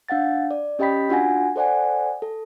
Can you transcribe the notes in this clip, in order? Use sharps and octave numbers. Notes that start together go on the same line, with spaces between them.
D4 F5 F#5 A6
D5
C#4 G4 D#5 G5 B5 B6
D4 F4 F#4 F#5 G#5 A#6
A4 C5 D5 F#5 G#5
A4